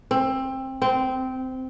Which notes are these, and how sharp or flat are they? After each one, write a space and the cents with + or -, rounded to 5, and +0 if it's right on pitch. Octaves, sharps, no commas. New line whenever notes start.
C4 +20
C4 -15